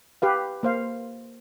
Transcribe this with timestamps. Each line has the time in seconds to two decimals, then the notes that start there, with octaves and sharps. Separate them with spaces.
0.22 G4 B4 F5
0.63 A#3 C5 F5